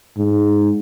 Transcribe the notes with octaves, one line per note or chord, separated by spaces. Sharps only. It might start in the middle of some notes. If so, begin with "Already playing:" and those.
G#2